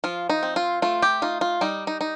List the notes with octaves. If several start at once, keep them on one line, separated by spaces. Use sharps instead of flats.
F3 F4
D#4
C4
F4
A3 F4
G4
D#4 F4
F4
G3 D#4
D#4
D#4